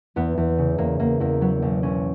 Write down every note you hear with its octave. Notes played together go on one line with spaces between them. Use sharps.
E2 B3
E2
C#3
E2 A#3
E2 A#3
E2 A#3
F#3 B3
B1 B3
B1 C#4